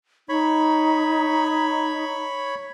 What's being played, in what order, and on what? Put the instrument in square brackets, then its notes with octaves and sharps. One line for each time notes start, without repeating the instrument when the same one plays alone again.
[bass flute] D#4 [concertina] C#5 B5